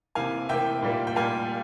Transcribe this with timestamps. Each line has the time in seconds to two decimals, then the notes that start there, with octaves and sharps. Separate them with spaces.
0.15 C3 E3 A#3 F5 G#5
0.49 C3 E3 A#3 E5 G5
0.82 A#2 G3 A#3
1.07 G5
1.16 A#2 G3 A#3 F5 G#5